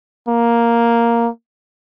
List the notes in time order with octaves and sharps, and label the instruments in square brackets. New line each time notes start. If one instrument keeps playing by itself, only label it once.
[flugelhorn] A#3